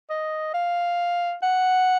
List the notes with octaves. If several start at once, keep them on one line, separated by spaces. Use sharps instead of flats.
D#5
F5
F#5